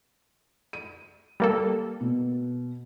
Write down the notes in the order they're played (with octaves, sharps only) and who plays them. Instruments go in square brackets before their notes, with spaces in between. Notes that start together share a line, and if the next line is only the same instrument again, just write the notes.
[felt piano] D#7
[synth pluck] G3 A#3 A4
[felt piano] B2